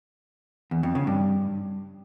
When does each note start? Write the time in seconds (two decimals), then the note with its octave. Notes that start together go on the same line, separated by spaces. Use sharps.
0.71 E2
0.83 F2
0.95 C#3
1.07 G2